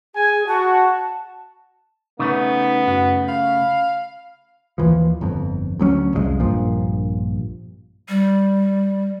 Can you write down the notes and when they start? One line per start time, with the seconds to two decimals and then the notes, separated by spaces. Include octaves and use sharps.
0.15 G#4 G#5
0.47 F#4 A5
2.19 C#3 A3 B3 C#4 D#4
2.87 F#2 F#4
3.28 F5 B5
4.78 D#2 E3 F3
5.21 G1 F2
5.79 D2 F#3 C4 C#4
6.13 C2 F2 F3 G#3
6.40 A#1 G2 A#2 F3
8.09 G3